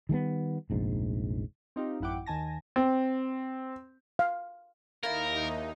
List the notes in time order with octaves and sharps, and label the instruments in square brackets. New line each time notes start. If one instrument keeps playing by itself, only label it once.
[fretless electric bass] D#3 G3 G#3 B3
F1 A#1 G#2
[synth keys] C4 D#4 F4 G4
A1 F#2 E4 F#5 G5 D6
D#2 D#3 G#5 A5 A#6
[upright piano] C4
[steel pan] F5
[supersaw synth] D#2 D#4 [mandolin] A#3 E4 A5 [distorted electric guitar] A#4